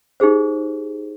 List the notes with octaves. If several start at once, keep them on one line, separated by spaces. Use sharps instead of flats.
D#4 G4 G#4 C5